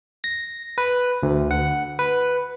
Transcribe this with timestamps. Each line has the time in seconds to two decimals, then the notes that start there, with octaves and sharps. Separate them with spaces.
0.24 A#6
0.78 B4
1.23 D2
1.51 F#5
1.99 B4